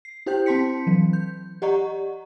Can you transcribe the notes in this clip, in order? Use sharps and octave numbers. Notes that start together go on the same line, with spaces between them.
C7
E4 G4 C5 G5 G6
C4 A5 C6 B6 C#7
E3 F#3
G6
G4 D5 D#5 F#5 A#5 C#6